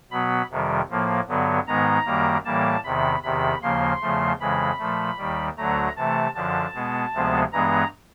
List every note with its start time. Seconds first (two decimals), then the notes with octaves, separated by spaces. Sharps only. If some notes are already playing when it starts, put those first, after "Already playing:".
0.11 B2 F#3 B3 B5
0.50 F2 C3 D#3 G3
0.89 A2 F3 A#3
1.28 G2 D3 F#3 B3
1.67 G#2 D#3 G#3 B3 A#5
2.06 F#2 D#3 G3 A#3
2.45 A2 E3 G3 A#3 A5
2.84 E2 C3 D#3 B5
3.23 E2 C3 D#3 B5
3.62 D#2 C#3 F3 A#3 C6
4.02 E2 C#3 F3 A3
4.40 F2 C#3 E3 G#3 B5
4.79 A#2 F3 A3
5.18 D#2 D#3 G3
5.57 D2 D3 F#3 A3 A#5
5.97 C3 E3 A3 A5
6.35 F#2 D3 F3 A5
6.74 B2 G#3 B3
7.13 D2 C3 F3 G#3 B3
7.52 G2 E3 G#3 B3 A#5